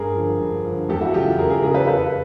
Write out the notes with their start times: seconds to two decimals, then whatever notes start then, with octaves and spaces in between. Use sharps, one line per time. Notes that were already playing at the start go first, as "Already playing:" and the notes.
Already playing: G2 G#4 A#4
0.15 D3 F3
0.39 G2
0.65 D3 F3
0.89 E2 G4 A4
1.01 E4 F#4
1.14 C#3 F#3 F4 G4
1.38 E2 G#4 A#4
1.50 G#4 A#4
1.62 C#3 F#3 G#4 A#4
1.74 A4 B4
1.87 F2 A4 B4